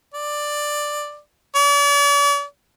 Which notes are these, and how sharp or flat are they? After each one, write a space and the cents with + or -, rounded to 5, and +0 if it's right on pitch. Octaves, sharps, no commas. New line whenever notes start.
D5 +10
D5 -45